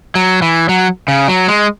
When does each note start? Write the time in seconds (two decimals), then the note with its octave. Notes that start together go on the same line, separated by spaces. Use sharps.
0.15 F#3
0.42 E3
0.69 F#3
1.08 C#3
1.28 F#3
1.48 G#3